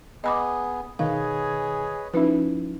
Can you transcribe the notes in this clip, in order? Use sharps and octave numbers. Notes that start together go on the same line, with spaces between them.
B3 G#4 D#5 B5 D6
B2 D#3 G#4 B4 C#5 D#5 F5
F3 C#4 D#4 E4 B4